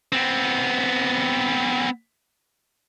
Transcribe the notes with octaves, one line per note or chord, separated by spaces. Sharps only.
B3 C4